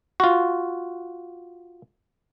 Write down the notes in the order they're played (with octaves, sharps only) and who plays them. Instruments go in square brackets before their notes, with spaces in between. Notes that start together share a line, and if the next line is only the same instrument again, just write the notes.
[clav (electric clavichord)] F4 F#4